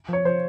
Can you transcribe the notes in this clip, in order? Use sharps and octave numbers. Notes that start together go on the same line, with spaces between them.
F3 C#5
F3 C5